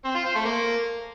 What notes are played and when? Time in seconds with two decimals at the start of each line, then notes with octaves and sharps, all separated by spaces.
0.05 C4
0.15 F4
0.25 C5
0.35 A3
0.45 A#3